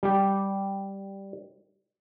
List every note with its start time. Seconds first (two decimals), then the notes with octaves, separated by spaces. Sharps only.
0.03 G3 G4